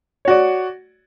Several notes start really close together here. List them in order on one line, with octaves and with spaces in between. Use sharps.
C#5 F#4 D5